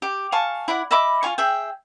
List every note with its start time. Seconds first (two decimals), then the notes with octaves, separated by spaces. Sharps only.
0.02 G4
0.32 F5 G#5 A5 C#6
0.68 E4 D5 F#5
0.91 D#5 E5 B5 D6
1.23 F4 F5 G#5 C#6
1.38 G#4 E5 G5